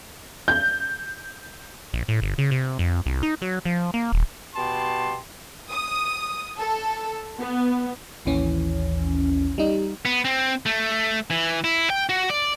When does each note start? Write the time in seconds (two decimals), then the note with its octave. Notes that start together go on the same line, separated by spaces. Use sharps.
0.48 G6
1.94 A#1
2.08 A2
2.22 G1
2.38 C#3
2.51 C3
2.79 F2
3.06 C2
3.23 D#4
3.42 F#3
3.65 F3
3.94 A#3
4.13 D#1
4.56 B2 G4 A5 C6
5.69 D#6
6.60 A4
7.38 B3
8.25 A1 D#2 E3 C#4
9.58 G3 D#4
10.05 B3
10.25 C4
10.66 A3
11.30 E3
11.64 E4
11.90 G5
12.09 F#4
12.30 D5